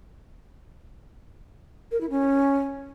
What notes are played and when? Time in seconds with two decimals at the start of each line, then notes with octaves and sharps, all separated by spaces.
1.92 A#4
2.01 E4
2.10 C#4